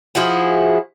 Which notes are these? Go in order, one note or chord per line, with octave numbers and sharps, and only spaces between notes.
F3 E4 F#4 G#4